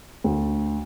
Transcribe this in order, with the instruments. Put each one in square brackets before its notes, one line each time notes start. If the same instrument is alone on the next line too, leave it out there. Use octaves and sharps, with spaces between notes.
[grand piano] D2